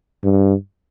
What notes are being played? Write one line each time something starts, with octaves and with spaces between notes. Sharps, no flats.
G2